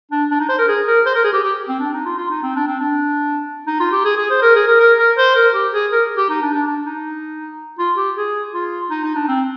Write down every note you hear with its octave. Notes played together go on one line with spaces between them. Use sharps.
D4
D4
D#4
C5
A#4
G#4
A#4
C5
A#4
G#4
G4
G4
C4
D4
D#4
F4
F4
D#4
C4
D4
C4
D4
D#4
F4
G4
G#4
G#4
C5
A#4
G#4
A#4
A#4
A#4
C5
A#4
G4
G#4
A#4
G4
D#4
D4
D4
D4
D#4
F4
G4
G#4
F4
D#4
D#4
D4
C4